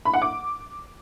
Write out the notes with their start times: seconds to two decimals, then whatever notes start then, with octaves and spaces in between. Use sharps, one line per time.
0.05 B5
0.14 F#5
0.22 D6